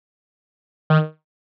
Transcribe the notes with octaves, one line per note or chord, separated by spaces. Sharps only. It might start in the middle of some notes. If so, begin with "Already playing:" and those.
D#3